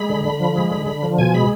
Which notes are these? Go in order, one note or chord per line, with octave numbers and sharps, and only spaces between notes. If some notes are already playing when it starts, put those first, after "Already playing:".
Already playing: G#3 B5
D3
D3
F3
G#3
D3
D3
F3
B2 G#5
G#3 B5